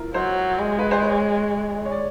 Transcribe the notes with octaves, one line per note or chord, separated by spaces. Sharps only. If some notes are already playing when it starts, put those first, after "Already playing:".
Already playing: E4 F4 A#4
F#3 C5
G#3
B4
C5
C#5
C#5
D5